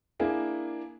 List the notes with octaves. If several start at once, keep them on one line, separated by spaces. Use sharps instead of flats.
A#3 D4 E4 G#4